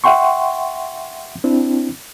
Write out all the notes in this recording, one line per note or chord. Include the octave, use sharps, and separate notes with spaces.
E5 F#5 G5 C6 C#6
C4 D4 E4